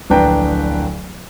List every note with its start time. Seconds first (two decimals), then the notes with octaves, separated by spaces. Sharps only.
0.10 D1 A#1 D4 B4 G5 A#5